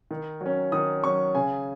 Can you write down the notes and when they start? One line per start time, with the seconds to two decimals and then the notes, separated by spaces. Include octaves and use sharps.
0.11 D#3
0.41 F#3
0.46 C#4
0.72 D#3 D#6
1.04 F#3 C#4 C#6
1.35 C#3 G#5